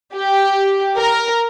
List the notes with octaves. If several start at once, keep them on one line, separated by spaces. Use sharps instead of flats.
G4
A#4